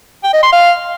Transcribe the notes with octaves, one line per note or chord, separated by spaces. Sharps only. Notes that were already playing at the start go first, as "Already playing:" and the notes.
G5
D#5
C6
F5